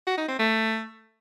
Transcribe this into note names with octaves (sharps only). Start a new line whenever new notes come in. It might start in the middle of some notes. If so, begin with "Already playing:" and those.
F#4
D#4
C4
A3